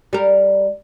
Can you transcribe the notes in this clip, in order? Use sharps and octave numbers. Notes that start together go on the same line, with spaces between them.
G3 A#4